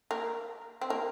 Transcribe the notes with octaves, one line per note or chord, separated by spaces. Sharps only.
A#3
C4
A#3